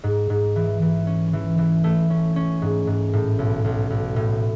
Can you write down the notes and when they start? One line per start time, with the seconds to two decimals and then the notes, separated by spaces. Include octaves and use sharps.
0.04 G#2
0.30 G#2
0.56 E3
0.82 E3
1.07 C#4
1.33 E3
1.58 E3
1.84 A3
2.10 C#4
2.36 C#4
2.62 G#2
2.87 G#2
3.13 A2
3.39 B1
3.64 B1
3.90 B1
4.16 A2